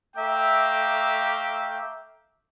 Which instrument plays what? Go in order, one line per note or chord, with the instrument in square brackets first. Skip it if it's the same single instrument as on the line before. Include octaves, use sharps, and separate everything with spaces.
[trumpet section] A3 E5 F5 G5 A#5 D6